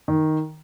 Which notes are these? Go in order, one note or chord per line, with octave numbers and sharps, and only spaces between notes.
D#3